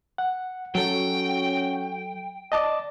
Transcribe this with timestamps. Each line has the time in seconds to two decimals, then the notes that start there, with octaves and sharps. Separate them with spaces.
0.18 F#5
0.75 F#3 C#4 F#4 A4 G5
2.52 D5 D#5 A5 D6